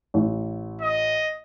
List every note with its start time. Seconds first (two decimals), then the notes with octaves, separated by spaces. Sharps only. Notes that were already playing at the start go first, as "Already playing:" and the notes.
0.14 A1
0.81 D#5